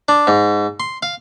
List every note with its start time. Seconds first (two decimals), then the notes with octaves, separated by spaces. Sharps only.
0.08 D4
0.27 G#2
0.80 C6
1.03 F5